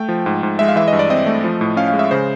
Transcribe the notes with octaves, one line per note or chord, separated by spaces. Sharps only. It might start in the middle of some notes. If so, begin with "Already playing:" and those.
Already playing: A3 G5
F3
G#2
G#2
G#3 E5
F5
E3 E5
G2 D#5
D5
C4 D#5
A3
F3
A2
C#4 F5
F5
G#3
E5
C#3 C5